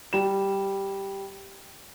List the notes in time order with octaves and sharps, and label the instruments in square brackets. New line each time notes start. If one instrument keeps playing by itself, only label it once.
[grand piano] G3 E7